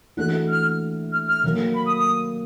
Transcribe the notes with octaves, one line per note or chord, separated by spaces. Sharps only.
E3 A3 D4 F#4 A4 F#6
F6
F6
F6
D#3 F#3 A#3
B5
D#6
D#6